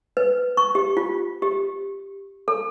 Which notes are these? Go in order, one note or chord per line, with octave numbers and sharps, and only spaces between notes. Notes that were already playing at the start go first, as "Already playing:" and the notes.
B4
C#6
G4
F4
G4
A4